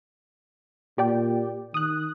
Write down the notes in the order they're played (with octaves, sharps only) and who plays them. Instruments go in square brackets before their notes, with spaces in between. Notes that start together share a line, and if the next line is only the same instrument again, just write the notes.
[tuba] A#2 [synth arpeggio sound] G4 D5 G5
[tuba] D#3 [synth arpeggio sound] D#6 F#6